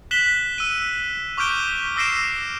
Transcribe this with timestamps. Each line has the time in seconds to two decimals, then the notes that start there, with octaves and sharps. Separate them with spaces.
0.11 F#6 B6 E7 F#7 G7
0.58 E6 D#7
1.37 C#6 D6 F6 G6 D7 G7
1.96 D6 E6 A#6 C7 D7 E7